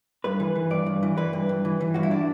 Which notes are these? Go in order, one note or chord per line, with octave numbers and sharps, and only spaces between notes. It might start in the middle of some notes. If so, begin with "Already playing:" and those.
G2 B4
E3
E3
G2 D5
G2
E3
E3 B4
G2
G2
E3
E3
G2 F#4
E4
D4